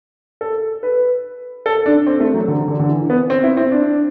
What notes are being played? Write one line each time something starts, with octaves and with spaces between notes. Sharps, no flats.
A4
B4
A4
D4
C4
A3
F#3
D3
D3
D3
E3
B3
C4
E4
C4
D4